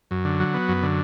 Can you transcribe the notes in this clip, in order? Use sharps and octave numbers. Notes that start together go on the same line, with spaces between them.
F#2
D3
F#3
B3
F#2
D3